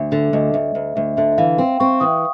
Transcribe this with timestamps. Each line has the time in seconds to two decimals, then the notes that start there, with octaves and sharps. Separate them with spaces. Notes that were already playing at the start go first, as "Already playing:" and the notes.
Already playing: D2 E5
0.12 D3 E5
0.33 D2 D#5
0.54 D2 E5
0.75 D2
0.96 D2 E5
1.17 D3 E5
1.32 E5
1.38 E3 F5
1.58 C4 G5
1.80 C4 C#6
2.00 E3 D#6